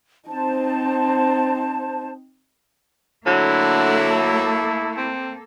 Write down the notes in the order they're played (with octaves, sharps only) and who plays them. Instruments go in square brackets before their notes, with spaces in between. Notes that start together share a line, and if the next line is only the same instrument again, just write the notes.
[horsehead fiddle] C4 D#4 [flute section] C5 A5
[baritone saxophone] D3 [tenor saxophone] F#3 [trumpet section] A3 E4 [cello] A#3 A4
[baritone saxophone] C4